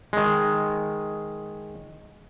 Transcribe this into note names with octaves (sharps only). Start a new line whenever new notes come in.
D#3 G#3